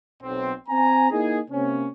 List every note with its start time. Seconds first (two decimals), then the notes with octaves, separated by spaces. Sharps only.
0.22 B1 C4
0.69 C4 G#5 A#5
1.10 A#3 D#4 E4 G#4
1.51 C3 A#3 C4 C#4